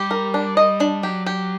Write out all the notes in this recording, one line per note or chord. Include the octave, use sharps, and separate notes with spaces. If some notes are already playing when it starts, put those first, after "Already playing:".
Already playing: G3 G4
A#4
D4
D#5
D4
F#3 G4
G4